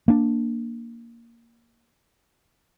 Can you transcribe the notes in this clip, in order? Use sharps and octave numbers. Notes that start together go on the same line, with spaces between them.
A#3 D4